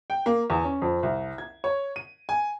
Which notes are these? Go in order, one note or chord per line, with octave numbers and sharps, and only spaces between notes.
G5
A#3
E2
C#4
F2
C2
G#6
C#5
D#7
G#5